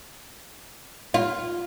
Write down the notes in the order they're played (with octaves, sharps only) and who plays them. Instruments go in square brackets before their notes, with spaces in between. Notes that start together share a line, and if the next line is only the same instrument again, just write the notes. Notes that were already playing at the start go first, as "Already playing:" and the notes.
[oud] F4